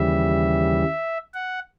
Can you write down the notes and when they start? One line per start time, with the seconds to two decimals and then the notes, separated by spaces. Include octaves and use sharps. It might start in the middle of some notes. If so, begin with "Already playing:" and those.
Already playing: D#2 C#3 E3 G3 E5
1.34 F#5